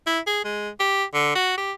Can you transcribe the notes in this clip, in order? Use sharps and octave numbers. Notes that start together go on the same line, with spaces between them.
E4
G#4
G#3
G4
D3
F#4
G4